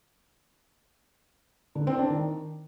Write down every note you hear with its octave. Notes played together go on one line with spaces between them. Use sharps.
D3
C4
D4
D#3